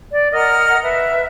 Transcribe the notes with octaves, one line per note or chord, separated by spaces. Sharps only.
D5
A#4 D#5 F#5 F6
B4 E5